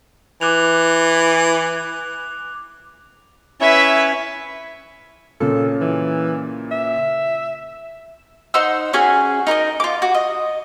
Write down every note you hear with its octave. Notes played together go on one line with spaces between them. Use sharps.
E3 D6 F#6 F7
C#4 E4 B4 C#5 E5
A#2 C#3 A4
E3
E5
D#4 C5 F#5 E6
C#4 F#4 G#4 G#5
D#4 A#4 C#5 D#5
F4 D6
F#4
D#5